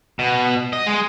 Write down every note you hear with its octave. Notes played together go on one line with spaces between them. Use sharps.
B2
D#5
G#3